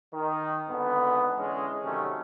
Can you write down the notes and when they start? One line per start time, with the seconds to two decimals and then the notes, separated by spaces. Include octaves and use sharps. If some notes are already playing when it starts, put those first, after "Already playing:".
0.13 D#3
0.68 G#1 G#2 D3 B3
1.37 D3 E3 G#3 C#4
1.84 C3 D#3 F#3 G3 A3 C#4